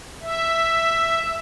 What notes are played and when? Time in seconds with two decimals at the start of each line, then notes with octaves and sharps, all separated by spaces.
0.22 E5